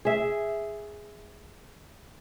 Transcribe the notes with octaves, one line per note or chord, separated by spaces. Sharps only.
G#4 E5